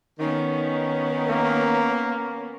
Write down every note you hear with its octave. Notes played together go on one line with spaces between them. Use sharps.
D#3 B3 C#4
A#3